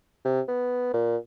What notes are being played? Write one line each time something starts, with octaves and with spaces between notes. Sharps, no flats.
C3
B3
A#2